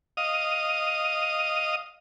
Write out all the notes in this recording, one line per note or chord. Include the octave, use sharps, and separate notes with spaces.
D#5 F5 D#6